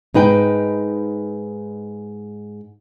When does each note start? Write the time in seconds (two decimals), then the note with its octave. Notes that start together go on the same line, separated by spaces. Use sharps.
0.14 G#2 D#4 B4 G5